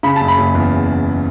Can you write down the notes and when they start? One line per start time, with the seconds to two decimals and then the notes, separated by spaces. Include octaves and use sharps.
0.03 C#3 B5
0.16 A5
0.21 F#1
0.28 B5
0.38 F#1
0.55 E2